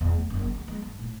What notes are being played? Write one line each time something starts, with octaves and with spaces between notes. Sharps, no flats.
E2
A3
F#1
C#3
D2
G#3
G2
A2